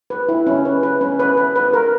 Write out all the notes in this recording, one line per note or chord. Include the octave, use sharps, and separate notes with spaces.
B4
E4
C#4
B4
B4
C#4
B4
B4
B4
A#4